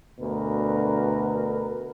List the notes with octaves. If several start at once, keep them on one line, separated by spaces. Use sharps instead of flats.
D2 B2 D3 A#4 B4